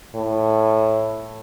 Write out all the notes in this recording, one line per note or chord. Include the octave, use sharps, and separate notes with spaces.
A2